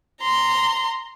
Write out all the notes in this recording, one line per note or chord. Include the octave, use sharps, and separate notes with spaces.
A#5 C6